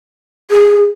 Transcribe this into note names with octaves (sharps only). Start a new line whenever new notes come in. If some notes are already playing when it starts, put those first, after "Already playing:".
G#4